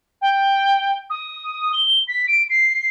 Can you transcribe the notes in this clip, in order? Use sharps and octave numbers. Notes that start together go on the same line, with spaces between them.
G5
D#6
G7
B6
D7
C7